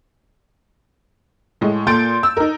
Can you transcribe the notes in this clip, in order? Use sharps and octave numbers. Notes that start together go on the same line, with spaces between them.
A2 G#3
A#2 A4 C6 G6 A6 D7
E6
D#4 A#4